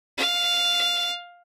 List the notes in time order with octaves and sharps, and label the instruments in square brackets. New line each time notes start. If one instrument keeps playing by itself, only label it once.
[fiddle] F5